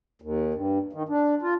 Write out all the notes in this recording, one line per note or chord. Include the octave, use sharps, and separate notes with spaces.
D#2
G2
D#3
D4
F4